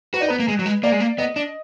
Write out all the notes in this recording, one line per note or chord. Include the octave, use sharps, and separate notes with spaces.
F#4 B4
D#4 D5
B3 B4
A#3
G#3
F#3
G#3
A#3 D5
G#3
A#3
B3 D#5
D4